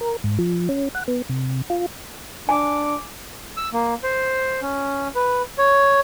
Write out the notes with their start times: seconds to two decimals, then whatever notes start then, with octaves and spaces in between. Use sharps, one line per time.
0.01 A#4
0.24 G#2
0.39 F3
0.69 C#4
0.95 F#5
1.08 B3
1.29 C3
1.70 F4
2.49 D4 G#5 D6
3.57 E6
3.73 A#3
4.03 C5
4.62 C#4
5.15 B4
5.58 C#5